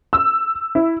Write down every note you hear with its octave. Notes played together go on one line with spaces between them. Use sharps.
E6
E4